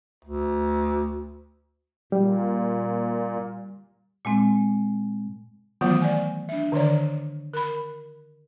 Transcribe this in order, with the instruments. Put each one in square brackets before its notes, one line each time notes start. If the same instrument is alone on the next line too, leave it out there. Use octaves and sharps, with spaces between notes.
[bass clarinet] D2
[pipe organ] A#2 [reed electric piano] G3
[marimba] A#2 G#3 C4
[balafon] D#3 E3 F#3 A3 B3 F4
D5 G#5
D4 E5
D3 D#3 C#5 D5
A#4 B5